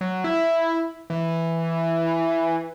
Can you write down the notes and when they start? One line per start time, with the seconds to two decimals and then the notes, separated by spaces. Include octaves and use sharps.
0.01 F#3
0.24 E4
1.10 E3